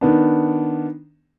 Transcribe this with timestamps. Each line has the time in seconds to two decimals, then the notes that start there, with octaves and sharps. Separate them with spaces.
0.01 D#3 B3 D4